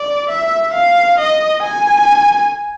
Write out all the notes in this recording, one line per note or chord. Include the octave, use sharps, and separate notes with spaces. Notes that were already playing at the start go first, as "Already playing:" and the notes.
Already playing: D5
E5
F5
D#5
G#5